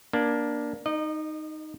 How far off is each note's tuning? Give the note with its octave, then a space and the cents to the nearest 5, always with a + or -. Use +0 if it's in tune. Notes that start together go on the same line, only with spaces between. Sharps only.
A#3 +20 D4 +0
D#4 +0 D#5 -35